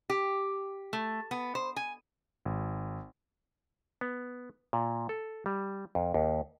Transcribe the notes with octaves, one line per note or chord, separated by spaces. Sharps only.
G4
A3
B3
C5
G#5
G#1
B3
A#2
A4
G3
F2
D#2